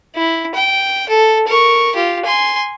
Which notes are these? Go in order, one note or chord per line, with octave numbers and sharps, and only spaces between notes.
E4
G5
A4
A#4 C#6
F4 G4
G#5 C6